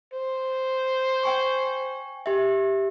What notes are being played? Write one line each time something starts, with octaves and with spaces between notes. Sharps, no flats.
C5
G5 G#5 C#6
G4 E5